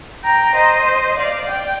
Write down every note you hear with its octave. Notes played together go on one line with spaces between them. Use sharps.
G5 A#5
C5 D#5
D5 F5
G5